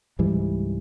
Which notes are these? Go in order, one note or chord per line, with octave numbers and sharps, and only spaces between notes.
C#2 G#2 E3 G3